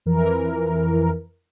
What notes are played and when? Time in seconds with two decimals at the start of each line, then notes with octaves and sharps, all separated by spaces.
0.06 F2 E3 A#4